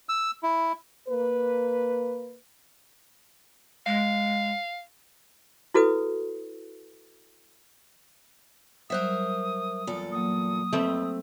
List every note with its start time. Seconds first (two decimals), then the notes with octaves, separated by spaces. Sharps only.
0.09 E6
0.43 E4
1.08 A#3 B4
3.86 G#3 F5
5.74 E4 F#4 A4 B4 D#6
8.90 F#3 G3 A#4 C5 E5 D#6 F#6
9.87 E2 A#2 A4
10.12 F#3 A#3 D#6
10.73 F2 A3 C4 B4